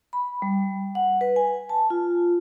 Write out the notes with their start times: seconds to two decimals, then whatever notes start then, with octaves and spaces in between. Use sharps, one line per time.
0.13 B5
0.42 G3
0.95 F#5
1.21 B4
1.36 G#5
1.69 A5
1.90 F4